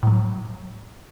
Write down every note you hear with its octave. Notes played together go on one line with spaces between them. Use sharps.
A2 F#3